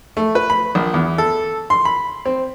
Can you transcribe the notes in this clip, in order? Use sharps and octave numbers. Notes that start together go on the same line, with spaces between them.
A3
B4
B5
A#1
E2
A4
C6
B5
C4